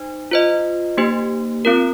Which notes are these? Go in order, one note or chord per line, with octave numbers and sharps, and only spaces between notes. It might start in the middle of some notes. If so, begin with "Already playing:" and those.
Already playing: D#4 C5
F4 C5 D#5
A#3 D#4 G4 C5
C4 F4 A#4